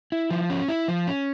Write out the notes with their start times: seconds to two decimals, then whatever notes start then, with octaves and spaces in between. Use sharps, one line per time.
0.12 E4
0.31 F3
0.50 C#4
0.68 E4
0.88 F3
1.07 C#4